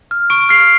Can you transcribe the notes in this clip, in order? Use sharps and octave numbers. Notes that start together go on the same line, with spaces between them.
F6
C#6 D7
F6 C7